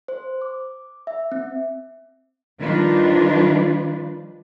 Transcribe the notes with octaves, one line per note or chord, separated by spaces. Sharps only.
C5
D6
E5
C4
D#3 F3 G3 D4 F4 B4